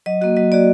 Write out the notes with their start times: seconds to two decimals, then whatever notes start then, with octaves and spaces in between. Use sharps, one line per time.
0.06 F#3 D#5
0.21 A#3 F#4 D#5
0.37 F#3 D#5
0.52 A#3 F#4 D5